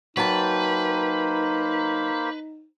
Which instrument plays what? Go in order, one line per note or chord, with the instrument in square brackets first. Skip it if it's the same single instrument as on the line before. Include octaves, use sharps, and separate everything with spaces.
[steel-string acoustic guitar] F#3 G5 A5 [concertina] A#3 C5 B5 [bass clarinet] D#4 [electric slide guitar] B4